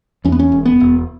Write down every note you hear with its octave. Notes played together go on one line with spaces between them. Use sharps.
E2 C#4
B3
C#4
E1
B3
E1